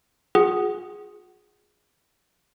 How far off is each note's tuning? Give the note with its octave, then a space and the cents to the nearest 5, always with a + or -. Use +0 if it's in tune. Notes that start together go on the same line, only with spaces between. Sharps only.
F4 +45 G#4 +0 F#5 +20